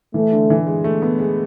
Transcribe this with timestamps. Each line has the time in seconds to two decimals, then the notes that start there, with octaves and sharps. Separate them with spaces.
0.14 E3 A3
0.32 D3
0.50 E3
0.67 G#3
0.84 A3
1.02 B3
1.19 G#3